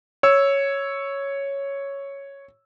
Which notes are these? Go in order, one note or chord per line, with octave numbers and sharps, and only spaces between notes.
C#5 E6